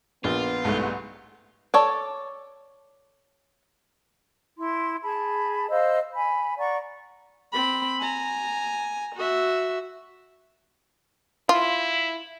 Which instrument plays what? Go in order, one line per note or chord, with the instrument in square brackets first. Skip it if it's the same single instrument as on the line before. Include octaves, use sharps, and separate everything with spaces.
[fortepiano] A#1 [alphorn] B3 [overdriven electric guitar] F4
[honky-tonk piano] C2 G#2 A3
[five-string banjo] A4 C#5 D5
[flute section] E4 C6
G#4 A5 B5
C5 D#5 F5 E6
G#5 B5
D5 F#5 A#5 C#6
[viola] C4 B5
G#5 A#5
F#4 E5
[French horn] E4 [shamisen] F4